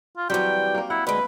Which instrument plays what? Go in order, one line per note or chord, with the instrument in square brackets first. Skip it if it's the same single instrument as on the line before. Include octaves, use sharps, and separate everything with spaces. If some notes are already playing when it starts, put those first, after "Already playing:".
[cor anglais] F4
[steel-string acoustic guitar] E3 G3 [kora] F#3 C4 G4 [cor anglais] G5
[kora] A#3 A#4
[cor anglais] E4 [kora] F#5
[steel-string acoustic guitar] D2 G#3 [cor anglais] B4